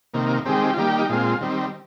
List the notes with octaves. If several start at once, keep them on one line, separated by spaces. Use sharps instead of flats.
C3 D#3 A#3
D#3 G#3 C4 G4
F4
D#3 G3 A#3 G4
D#4
A#2 G#3 C4 F4
D#3 G3 C4